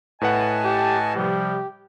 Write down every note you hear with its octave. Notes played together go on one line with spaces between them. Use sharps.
A2 B4 D#5 F#5 G#5 A5
G4
C3 F3 G3 G4